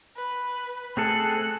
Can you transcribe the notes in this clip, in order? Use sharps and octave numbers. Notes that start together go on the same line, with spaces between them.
B4
A3 C4 G#4 A4 F#6